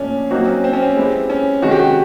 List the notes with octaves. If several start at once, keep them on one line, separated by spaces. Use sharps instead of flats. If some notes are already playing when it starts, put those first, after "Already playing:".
Already playing: A#2 F3 A3 C#4 D4
F#3 A#3 C4 D#4 F#4
C#4
C4
C#4
C4
G#3 B3 E4 G4
C#4
C3 D#3 G#3 C#4 F#4
G4
F#4